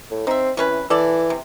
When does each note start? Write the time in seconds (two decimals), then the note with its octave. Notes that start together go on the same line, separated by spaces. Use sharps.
0.11 A2
0.27 C4 D#4 E5
0.57 C3 E3 C#4 B4
0.90 E3 A4 D5
1.30 C3